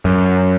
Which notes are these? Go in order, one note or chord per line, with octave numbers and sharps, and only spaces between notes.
F#2